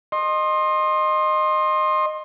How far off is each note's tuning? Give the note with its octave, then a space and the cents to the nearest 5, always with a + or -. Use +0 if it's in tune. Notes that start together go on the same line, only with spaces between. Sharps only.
D#5 -15 C6 +25